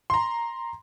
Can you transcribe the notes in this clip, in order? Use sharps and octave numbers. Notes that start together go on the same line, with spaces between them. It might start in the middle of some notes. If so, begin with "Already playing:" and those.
A#5 C6